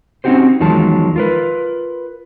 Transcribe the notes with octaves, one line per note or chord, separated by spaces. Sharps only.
C4 C#4 D#4 F#4 G4 C5
E2 D#3 F3 F#3 G#3 A5
F4 A#4 B4